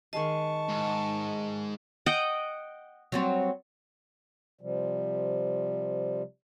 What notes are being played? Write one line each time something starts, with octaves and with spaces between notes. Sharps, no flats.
D#3 G#3 D#5 F5 A5 C#6
G#2
D#5 F#5 G5
F#3 G3 C4
C3 F3 G3